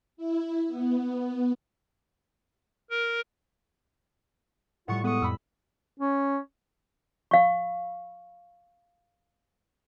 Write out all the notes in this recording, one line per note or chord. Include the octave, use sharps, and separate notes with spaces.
E4
B3
A#4
A2 G3 F4 F#5 C#6
G#3 B3 A4 F#5 C#6 D#6
F2 B5 E6
C#4
F5 C#6